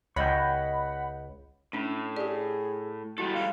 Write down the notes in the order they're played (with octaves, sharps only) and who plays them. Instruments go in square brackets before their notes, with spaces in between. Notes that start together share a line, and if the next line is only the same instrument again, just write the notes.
[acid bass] C#2 [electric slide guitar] C#5 D#5 G5 [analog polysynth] F#5 B5
[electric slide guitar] A2 [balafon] C#4 D4
[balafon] G4 D5 [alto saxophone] G#4
[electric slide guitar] G3 G#3 A4 [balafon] E4 [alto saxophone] F#4
[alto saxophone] F5